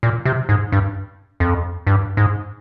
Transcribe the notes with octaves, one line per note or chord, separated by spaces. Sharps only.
A#2
C3
G#2
G2
F2
G2
G#2